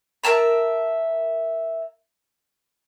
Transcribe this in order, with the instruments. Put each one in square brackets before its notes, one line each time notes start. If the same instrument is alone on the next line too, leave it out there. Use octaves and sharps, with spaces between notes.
[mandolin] A#4 E5 A5 A#5